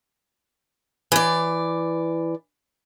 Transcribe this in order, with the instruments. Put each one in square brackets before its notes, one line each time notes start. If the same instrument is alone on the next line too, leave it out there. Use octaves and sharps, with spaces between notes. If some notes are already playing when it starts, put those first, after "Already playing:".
[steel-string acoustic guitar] E3 D5